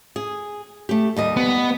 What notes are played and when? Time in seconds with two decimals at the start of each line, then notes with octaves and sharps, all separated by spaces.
0.16 G#4
0.89 A3 G4
1.17 D#2 G3 D#5
1.36 B3